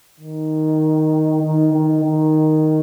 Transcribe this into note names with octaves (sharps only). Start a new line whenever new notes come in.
D#3
D#3
D#3
D#3